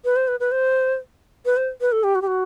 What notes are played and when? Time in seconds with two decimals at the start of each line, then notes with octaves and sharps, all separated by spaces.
0.05 B4
0.16 C5
0.28 B4
0.40 B4
0.52 C5
1.46 B4
1.57 C5
1.81 B4
1.92 A4
2.04 G4
2.15 F#4
2.22 G4
2.27 F#4